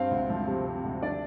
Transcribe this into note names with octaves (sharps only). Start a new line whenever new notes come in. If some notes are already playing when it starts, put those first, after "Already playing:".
Already playing: G2 C4 F5
D2
F3
C3
C4
D2
D4 D5